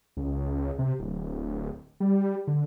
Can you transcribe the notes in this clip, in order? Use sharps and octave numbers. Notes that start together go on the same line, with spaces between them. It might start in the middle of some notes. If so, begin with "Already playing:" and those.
C#2
C3
D1
G3
D3